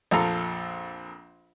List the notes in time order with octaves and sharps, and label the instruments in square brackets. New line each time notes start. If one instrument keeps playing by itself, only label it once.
[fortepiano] A#1 F2 F4 A4 F5 A#5